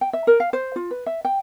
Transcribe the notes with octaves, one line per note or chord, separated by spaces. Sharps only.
G5
E5
A#4
F5
C5
F4
B4
E5
G5